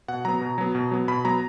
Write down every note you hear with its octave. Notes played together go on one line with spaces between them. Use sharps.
B2 F#5
F#3 B3 A#5
B2
F#3 B3
B2
F#3 B3
B2 B5
F#3 B3 A#5